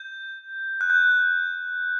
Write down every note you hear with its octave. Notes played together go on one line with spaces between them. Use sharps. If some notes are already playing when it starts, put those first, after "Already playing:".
Already playing: G6
F#6
G6